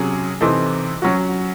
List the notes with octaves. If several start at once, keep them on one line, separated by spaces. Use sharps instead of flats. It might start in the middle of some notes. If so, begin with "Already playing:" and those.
Already playing: C3 F#3 C#4 G#4
C3 E3 C4 D#4 A4
F#3 C#4 F#4